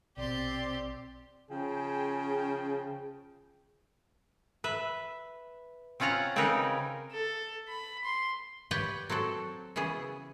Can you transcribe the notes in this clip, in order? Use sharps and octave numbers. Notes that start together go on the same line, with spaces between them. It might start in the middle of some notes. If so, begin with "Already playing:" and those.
A#1 B2 C4 G4 D5 C6
C#3 F3 G#4 G5
B4 E5
C4 C#4 F4 F#5 A#5
C#3 C4 C#4 D#4 A#4 B4
A4
B5
C6
G4 B4 C#5 D5 F#5 G5
F#3 C4 F#4 A4
C#3 E3 B3 G#4